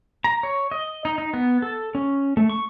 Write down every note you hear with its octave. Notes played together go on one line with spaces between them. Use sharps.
A#5
C#5
D#5
D#4
D#4
B3
A4
C#4
A3
C#6